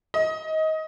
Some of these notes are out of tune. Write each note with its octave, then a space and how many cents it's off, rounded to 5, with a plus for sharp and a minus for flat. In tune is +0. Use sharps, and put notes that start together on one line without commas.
D#5 +20